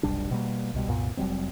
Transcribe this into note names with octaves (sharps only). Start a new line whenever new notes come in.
F1 B1 G3 D4
B2 G3 A#3
C2 B2 G3
C2 F#2 A#2 B3
F1 F#3 G3 C4